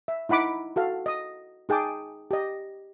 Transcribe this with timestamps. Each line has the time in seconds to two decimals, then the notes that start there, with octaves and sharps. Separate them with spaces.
0.08 E5
0.29 D#4 E4 F#5 B5 D6
0.76 F#4 A4 F5
1.06 D#5 D#6
1.69 D#4 G#4 G5 A5 D6
2.31 G4 D#5